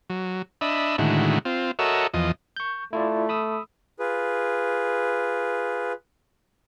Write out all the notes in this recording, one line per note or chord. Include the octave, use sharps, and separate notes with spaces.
F#3
D4 D#5 E5 B5
A2 D3 D#3 G#3 E4 F#4
C4 F4
F#4 A4 A#4 C#5 D#5 E5
E2 F3 D#5
C#6 G6
A3 E4 F4 D5
B5 D#6 E6
F4 G#4 B4